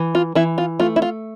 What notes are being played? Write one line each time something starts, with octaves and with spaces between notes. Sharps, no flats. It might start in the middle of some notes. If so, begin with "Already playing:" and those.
Already playing: E3
F4
E3 E4
F4
A3 F4
E4
F4